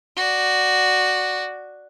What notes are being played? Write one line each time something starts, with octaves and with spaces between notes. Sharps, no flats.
F#4 D5